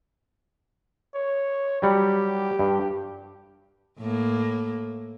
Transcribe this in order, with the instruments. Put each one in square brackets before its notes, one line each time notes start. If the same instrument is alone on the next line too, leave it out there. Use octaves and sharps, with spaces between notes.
[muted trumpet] C#5
[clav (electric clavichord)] F#3 G3 F#5 [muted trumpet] G4
[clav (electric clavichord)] G2
[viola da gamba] A2 A#3